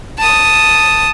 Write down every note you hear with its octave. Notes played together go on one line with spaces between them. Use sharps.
A5 D#6